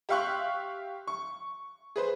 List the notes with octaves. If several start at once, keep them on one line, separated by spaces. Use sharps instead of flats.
G4 E5 F5 C6 C#6 F#6
C#6
G#4 B4 C5